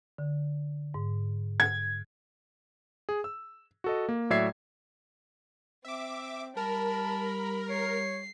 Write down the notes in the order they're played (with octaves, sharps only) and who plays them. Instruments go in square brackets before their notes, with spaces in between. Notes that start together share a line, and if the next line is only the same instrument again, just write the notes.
[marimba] D3
G#2
[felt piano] G#6
[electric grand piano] G#4
E6
F#4 A4 D#5
A#3
A2 F#3 D5 E5 G#6 C7
[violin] C4 [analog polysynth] E5 D6
[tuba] G3 [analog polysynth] A#4 [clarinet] A5 [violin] B5
[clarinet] C#5 [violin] C7